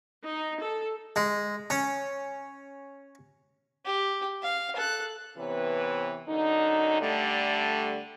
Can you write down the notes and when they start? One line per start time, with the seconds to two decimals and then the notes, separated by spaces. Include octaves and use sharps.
0.25 D#4
0.62 A4
1.16 G#3
1.70 C#4
3.85 G4
4.43 F5
4.76 A4 F#6
5.37 C3 E3 B3 B4 C#5
6.27 F#2 D3 D#4
7.01 D3 G3 A3